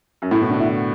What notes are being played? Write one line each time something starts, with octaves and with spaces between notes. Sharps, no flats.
F#2
A2 E4
B2
D3
E4